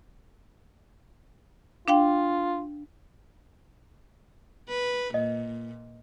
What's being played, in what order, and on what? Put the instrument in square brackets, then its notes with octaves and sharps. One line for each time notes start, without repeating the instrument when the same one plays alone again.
[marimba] D4 F5 G5 [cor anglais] F4
[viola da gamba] B4
[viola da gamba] A#2 [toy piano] D#5